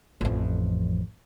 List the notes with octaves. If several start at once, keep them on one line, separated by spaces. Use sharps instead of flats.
A1 F2